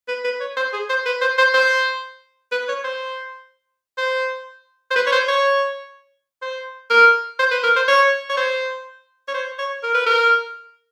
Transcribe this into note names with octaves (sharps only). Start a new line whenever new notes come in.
B4
B4
C#5
C5
G#4
C5
B4
C5
C5
C5
B4
C#5
C5
C5
C5
B4
C#5
C5
C#5
C5
A#4
C5
B4
A#4
C5
C#5
C#5
C5
C#5
C5
C#5
A#4
B4
A#4